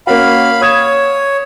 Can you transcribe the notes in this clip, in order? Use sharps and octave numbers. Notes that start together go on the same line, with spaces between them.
A#3 C#4 F#4 F5 B5
C#5 D#6 G#6 E7